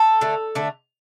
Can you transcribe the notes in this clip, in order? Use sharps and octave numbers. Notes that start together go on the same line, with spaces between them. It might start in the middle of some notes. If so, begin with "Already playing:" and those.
Already playing: A4
D3 A3
D3 A3